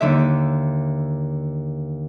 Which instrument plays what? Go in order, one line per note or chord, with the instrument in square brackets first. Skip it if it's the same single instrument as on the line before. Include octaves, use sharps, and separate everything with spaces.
[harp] D#2 D3 E5